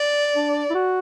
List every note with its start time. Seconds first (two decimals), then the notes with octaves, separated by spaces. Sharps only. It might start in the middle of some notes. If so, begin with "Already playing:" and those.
Already playing: D5
0.35 D4
0.70 E4
0.75 F#4